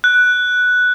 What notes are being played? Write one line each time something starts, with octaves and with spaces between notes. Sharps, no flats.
F#6